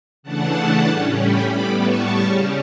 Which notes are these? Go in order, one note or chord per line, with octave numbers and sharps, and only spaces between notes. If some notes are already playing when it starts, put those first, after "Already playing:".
C#3 E3 A3 D4 F#5 A5
A2 G3 C#4
G5 B5
A2 G3 B3 B5 D6
A5 C#6
C#3 G3 C#4